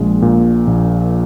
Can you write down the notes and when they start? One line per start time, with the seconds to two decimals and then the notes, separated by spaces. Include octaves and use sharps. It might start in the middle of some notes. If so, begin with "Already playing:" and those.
Already playing: A#1 G#3
0.22 A#2
0.67 A#1